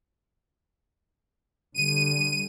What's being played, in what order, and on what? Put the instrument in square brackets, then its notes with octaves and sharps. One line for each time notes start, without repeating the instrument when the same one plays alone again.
[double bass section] D3 G3 [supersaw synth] D#7